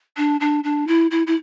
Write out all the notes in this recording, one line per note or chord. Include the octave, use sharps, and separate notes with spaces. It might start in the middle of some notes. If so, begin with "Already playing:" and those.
D4
D4
D4
E4
E4
E4